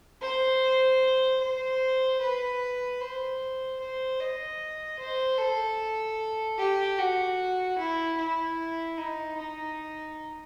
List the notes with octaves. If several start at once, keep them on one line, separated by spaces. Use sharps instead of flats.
C5
C5
B4
C5
C5
D#5
C5
A4
G4
F#4
E4
E4
D#4
D#4